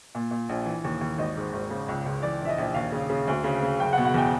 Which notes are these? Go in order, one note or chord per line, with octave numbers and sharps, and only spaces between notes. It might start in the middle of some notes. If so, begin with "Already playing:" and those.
A#2
A#2
A#1
E3
D#2
D#2
G#1 D#5
G#2
G#1
C#3
C#2
C#2
E3 D5
A#1 E5
D#5
A#1
D#2 F5
C#3
C#3
D2
C#3
C#3
F#1 G5
F#5
B2
F#5
E2 G5